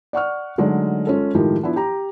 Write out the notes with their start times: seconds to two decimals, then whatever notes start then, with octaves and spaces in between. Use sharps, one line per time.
0.13 D5 F#5 C#6 F6
0.58 D3 F#3 G#3 A3 D#4
1.07 G#3 C#4 F4 A4
1.35 A2 D#3 F3 G#3 F4 G4
1.63 F3 B3 D4 E4
1.76 G4 A#5